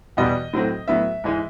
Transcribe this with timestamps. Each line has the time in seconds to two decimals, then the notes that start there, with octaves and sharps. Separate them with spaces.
0.17 E2 B2 G3 B3 D#5
0.53 A2 F#3 A3 C4
0.88 A2 F#3 B3 E5
1.24 G#2 E3 G#3